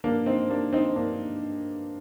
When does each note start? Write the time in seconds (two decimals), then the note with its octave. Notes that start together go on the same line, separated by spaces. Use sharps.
0.04 A#3 D4
0.26 C4 D#4
0.50 A#3 D4
0.73 C4 D#4
0.96 A#3 D4